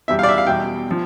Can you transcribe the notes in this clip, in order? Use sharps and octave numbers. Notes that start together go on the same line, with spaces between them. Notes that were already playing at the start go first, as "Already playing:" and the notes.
E2 B2 G3 E5
F5
D5
E5
F5
E2 B2 G3 G5
F3